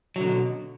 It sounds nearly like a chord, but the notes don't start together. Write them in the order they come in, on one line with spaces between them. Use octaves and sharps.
F#3 D3 B2